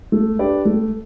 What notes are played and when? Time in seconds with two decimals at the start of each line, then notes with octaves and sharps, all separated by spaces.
0.12 A3
0.39 D4 G4 B4 D5
0.65 A3